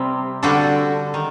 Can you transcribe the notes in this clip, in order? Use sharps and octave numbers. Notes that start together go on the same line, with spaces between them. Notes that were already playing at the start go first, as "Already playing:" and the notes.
Already playing: C3 G3 C4
D3 G3 D4 F#4 A4
D#3